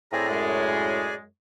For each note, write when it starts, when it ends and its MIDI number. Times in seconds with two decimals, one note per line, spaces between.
0.13 1.13 45
0.13 0.27 60
0.13 1.14 68
0.13 1.14 74
0.13 0.27 76
0.13 1.14 80
0.13 0.27 82
0.29 1.25 42
0.29 1.25 56